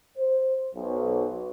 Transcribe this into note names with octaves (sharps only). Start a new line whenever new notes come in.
C5
B1